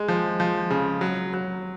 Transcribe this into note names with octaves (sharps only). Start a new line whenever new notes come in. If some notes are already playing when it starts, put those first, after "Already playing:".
Already playing: G#3
F3
F3
C#3
F#3
F#3